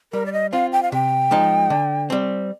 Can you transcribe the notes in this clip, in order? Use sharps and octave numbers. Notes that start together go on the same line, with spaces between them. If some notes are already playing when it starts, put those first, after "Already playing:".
G3 A#4
D5
D#5
C4 F4 F5
G5
F5
C3 G5
F3 G#3 D#4
D3
G3 C4